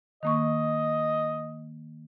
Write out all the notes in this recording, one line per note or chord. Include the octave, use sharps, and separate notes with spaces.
D#3 A#3 D#5 C#6